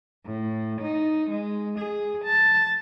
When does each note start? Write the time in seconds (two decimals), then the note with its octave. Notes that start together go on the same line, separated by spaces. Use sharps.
0.25 A2
0.81 D#4
1.30 G#3
1.78 G#4
2.24 A5